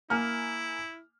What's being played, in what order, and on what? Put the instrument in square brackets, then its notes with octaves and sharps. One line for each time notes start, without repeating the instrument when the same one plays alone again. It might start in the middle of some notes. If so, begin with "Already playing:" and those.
[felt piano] A#3 G#5 F6 [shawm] E4